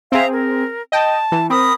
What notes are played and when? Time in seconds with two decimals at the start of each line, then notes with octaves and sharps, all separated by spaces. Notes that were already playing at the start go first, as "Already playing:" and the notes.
0.12 C4 G#4 E5 F5 A#5
0.32 A#4
0.92 D#5 G5 A5
1.32 E3
1.50 C4 A#4 B5 D#6